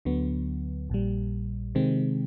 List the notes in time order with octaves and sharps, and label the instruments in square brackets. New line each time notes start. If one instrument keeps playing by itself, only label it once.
[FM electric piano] D2 D3 F#3 B3
A#1 A#2 G3
C3 D#3 G#3 C4